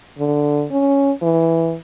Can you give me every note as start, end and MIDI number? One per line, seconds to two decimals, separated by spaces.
0.18 0.65 50
0.71 1.12 61
1.22 1.76 52